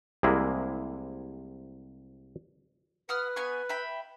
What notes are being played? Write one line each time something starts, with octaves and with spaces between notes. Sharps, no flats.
C2 C3 G#3 A#3 E4 G#4
B4 F#5 D#6 F6
B3 G#5 C#6
E5 G5 B5